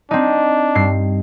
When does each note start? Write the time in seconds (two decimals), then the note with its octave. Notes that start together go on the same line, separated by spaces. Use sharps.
0.11 C4 D4 D#4
0.75 G2 C7